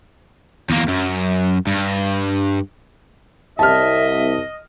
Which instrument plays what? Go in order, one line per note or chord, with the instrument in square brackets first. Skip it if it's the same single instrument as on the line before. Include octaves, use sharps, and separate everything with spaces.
[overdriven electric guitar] E2 A#3
F#2
G2
[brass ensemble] C2 [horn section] D#5 [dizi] E5 [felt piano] A5 F6